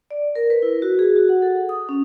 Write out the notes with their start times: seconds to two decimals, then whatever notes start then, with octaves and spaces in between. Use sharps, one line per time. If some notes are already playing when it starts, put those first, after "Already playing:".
0.11 D5
0.36 A#4
0.50 B4
0.62 E4
0.82 F#4
0.99 G#4
1.16 F#4
1.29 F#5
1.42 A4
1.69 D#6
1.89 C#4